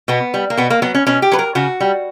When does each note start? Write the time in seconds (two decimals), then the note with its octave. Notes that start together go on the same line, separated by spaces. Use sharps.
0.08 B2 B3
0.34 G3
0.50 A#3
0.57 B2 B3
0.70 A#3
0.82 F#3 B3
0.95 C#4
1.07 B2 C#4
1.22 G4
1.32 F#3 B4
1.39 A#4
1.55 C#3 F#4
1.80 G3